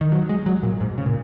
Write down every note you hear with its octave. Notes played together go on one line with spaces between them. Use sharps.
D#3
F#3
G#3
F#3
A#2
G#2
C#3
A#2